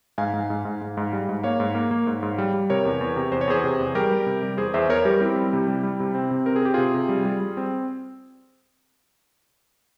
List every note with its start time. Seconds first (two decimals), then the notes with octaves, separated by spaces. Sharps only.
0.18 G#2 F5 G#5
0.33 G#2
0.50 G#2
0.65 G#2
0.82 G#2
0.97 G#2
1.13 G3
1.29 G#2
1.44 A#3 C#5 F5
1.60 G#2
1.75 A#3
1.91 A#3
2.07 G#2
2.23 G#2
2.38 G3
2.54 G3
2.70 C3 A#4 C#5
2.85 E2
3.01 E2
3.16 C3
3.32 E2 C5
3.41 C#5
3.48 E2 G#4 C5
3.64 C3
3.79 E2
3.95 G3 G4 A#4
4.12 G3
4.26 C3
4.43 G3
4.58 E2 G#4 C5
4.74 E2 C5 E5
4.89 E2 A#4 C#5
5.05 G3 G4 A#4
5.20 C4 E4 G4
5.36 G3
5.53 C3
5.68 G3
5.83 G3
6.00 C3
6.15 C4
6.31 C3
6.46 C4 A#4
6.56 G#4
6.63 C4 G4
6.74 C3 F4 G#4
6.94 C3
7.09 G3
7.25 G3
7.41 G3
7.57 C4